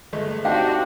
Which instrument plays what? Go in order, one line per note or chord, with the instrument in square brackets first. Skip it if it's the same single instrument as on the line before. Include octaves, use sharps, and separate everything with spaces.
[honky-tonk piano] G1 G#3 A3
[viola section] C4 F#4 [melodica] D4 G4 [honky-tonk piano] D#4 [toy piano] F5 G5